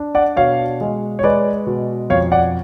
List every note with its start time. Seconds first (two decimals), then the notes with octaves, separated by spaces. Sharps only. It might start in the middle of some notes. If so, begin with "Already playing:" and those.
Already playing: D4
0.15 D5 F#5
0.37 B2 C#5 F5
0.81 G#3
1.19 C#5
1.23 G#3 B4 D5
1.66 B2
2.10 F2 C#5 F5
2.32 D5 F#5